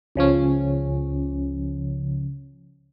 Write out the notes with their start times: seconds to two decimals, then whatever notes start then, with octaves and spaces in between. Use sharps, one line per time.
0.15 C#2 C#3 F3 C#4